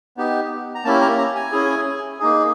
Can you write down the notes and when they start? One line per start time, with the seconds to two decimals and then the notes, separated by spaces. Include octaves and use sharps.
0.17 B3 D#4 G4
0.75 A#5
0.84 A#3 C#4 E4 G4 A5
1.01 A#5
1.18 A#5
1.35 G#5
1.52 C#4 E4 G#4
2.20 A#3 D#4 G#4